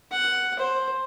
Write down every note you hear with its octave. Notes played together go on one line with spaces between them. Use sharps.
F#5
C5